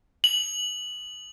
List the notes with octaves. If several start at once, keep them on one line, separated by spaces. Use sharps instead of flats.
F#7